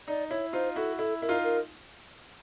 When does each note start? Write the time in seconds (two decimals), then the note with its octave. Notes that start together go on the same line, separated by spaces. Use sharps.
0.08 D#4 D5
0.30 E4 C#5
0.53 D#4 F4 C5
0.76 E4 F#4 A4
0.98 E4 A4
1.22 E4 A#4
1.29 D#4 F4
1.44 A#4